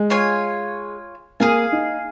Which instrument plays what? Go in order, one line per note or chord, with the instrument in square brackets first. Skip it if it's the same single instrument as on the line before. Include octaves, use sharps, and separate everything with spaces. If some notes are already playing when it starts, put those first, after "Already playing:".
Already playing: [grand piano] G#3
[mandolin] F4 C#5 G#5
[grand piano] A#3 [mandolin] G#4 F5 G#5
[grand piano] D#4